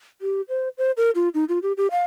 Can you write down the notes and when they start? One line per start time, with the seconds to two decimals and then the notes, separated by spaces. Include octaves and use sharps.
0.21 G4
0.49 C5
0.78 C5
0.97 A#4
1.15 F4
1.34 D#4
1.49 F4
1.63 G4
1.77 G4
1.91 F5